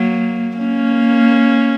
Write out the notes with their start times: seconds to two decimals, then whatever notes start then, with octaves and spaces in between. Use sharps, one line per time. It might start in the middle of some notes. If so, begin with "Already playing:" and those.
Already playing: F#3 A#3
0.58 A#3 C#4